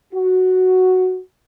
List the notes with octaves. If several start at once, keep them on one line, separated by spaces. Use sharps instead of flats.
F#4